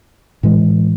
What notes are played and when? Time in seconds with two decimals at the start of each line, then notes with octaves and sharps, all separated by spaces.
0.43 A2 E3 G#3